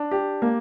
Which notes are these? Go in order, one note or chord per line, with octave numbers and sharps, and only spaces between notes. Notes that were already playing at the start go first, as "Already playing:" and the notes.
Already playing: D4
G4
A#3